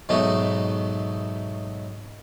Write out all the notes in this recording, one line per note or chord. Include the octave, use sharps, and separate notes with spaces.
G#2 B2 F#3 A3 B3 F#4